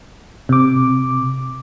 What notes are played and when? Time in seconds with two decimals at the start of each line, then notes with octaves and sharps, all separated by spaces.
0.49 C3 D6